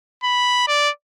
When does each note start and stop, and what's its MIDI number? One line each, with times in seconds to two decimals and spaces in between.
0.23 0.66 83
0.67 0.90 74